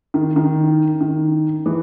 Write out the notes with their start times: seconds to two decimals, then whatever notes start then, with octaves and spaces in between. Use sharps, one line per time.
0.14 D#3
0.36 D#3
1.01 D#3
1.66 E3